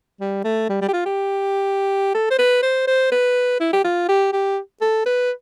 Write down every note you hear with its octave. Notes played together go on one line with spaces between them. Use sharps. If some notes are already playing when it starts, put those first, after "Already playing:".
G3
A3
G3
G3
G4
F4
G4
A4
C5
B4
C5
C5
B4
E4
G4
F4
G4
G4
A4
B4